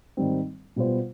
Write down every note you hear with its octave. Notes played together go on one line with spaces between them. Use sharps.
G#2 D#3 G3 C4
B2 G3 B3 F4 C5